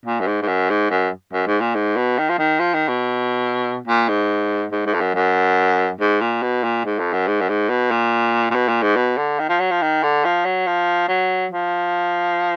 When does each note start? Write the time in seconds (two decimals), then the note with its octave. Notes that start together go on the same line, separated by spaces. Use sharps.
0.05 A#2
0.20 F#2
0.27 G#2
0.42 G#2
0.48 F#2
0.70 G#2
0.90 F#2
1.33 F#2
1.47 G#2
1.60 A#2
1.75 G#2
1.96 B2
2.18 D#3
2.29 F3
2.39 D#3
2.59 F3
2.74 D#3
2.88 B2
3.87 A#2
4.09 G#2
4.72 G#2
4.86 G#2
4.94 F2
5.01 F#2
5.15 F#2
6.00 G#2
6.21 A#2
6.42 B2
6.63 A#2
6.85 G#2
6.99 F2
7.13 F#2
7.27 G#2
7.41 F#2
7.49 G#2
7.69 B2
7.91 A#2
8.50 A#2
8.55 B2
8.68 A#2
8.82 G#2
8.96 B2
9.18 D3
9.39 D#3
9.49 F3
9.60 F#3
9.71 F3
9.82 D#3
10.03 D3
10.25 F3
10.45 F#3
10.67 F3
11.08 F#3
11.51 F3